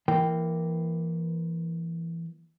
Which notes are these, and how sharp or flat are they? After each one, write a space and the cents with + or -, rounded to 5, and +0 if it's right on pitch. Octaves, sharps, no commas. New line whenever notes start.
E3 +20 A#3 +0 G5 +0